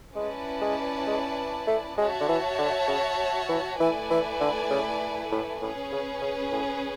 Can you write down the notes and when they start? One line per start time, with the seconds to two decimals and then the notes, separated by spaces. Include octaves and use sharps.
0.15 G#3 C#4 E4 B4 D5 A5
0.61 G#3
1.07 G#3
1.67 A3
1.98 G#3 F#4 C#5 E5 A5
2.20 D3
2.28 E3
2.58 D3
2.88 C#3
3.49 E3
3.79 E3 A3 E4 B4 D5 G#5
4.10 E3
4.40 D3
4.70 C#3
5.32 A2
5.61 A2 C#4 G#4 B4
5.92 C#3
6.21 C#3
6.52 A2